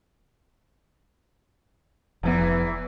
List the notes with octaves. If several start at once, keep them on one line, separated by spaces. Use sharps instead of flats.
F1 E2 E3 F3 B3